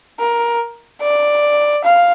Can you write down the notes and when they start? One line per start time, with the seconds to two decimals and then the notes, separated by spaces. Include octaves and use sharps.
0.19 A#4
1.02 D5
1.84 F5